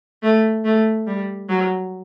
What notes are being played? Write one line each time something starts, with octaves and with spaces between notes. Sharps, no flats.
A3
A3
G3
F#3